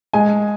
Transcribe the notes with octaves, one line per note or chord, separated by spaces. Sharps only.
G#3 G#5